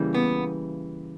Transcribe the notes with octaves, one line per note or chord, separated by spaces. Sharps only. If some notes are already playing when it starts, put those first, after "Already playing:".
Already playing: C#3 E3 G3 A#3
B3